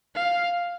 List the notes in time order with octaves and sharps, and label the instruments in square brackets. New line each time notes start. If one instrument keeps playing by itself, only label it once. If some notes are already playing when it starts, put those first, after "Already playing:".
[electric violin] F5